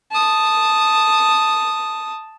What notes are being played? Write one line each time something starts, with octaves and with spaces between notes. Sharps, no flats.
A5 D#6